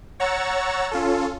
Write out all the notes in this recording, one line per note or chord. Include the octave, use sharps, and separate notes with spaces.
C#5 F#5 A#5 C#6 E6 A6
C#4 F4 A4